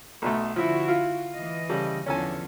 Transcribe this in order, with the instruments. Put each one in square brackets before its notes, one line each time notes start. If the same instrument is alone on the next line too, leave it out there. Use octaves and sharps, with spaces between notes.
[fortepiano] B1 B2 A3
[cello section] D3 E4 F#4 [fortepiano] F3 E5
[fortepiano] F4
[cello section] E3 D#5
[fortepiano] C#3 G3 A4
[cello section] E2 D3 F3 [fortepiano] C#4 A4 G#5